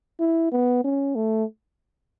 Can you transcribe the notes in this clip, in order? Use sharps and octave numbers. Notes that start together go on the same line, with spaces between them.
E4
B3
C#4
A3